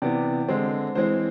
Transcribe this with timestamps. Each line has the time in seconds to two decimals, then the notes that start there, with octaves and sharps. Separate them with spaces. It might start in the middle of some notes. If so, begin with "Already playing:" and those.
0.02 C3 E3 B3 D5
0.49 D3 G#3 C4
0.95 E3 G#3 C4 C5